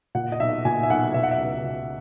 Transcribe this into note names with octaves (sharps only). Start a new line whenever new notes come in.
A#2 F#5
D#5
B1 E5
A#2 G#5
E5
B1 F#5
B2 E5
F#5
E5
C#2
B2